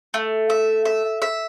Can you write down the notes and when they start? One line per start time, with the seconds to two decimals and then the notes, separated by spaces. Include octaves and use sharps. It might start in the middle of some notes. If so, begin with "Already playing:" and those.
0.14 A3
0.50 E5
0.85 E5
1.22 E5